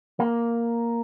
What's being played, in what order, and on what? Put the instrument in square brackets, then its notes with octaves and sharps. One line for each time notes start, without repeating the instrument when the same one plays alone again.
[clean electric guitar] A#3